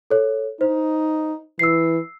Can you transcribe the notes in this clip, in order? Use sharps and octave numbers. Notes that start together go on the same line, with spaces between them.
A4 C#5
D#4 C5
E3 E6 C7